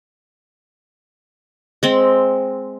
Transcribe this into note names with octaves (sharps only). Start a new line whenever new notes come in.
G#3 C4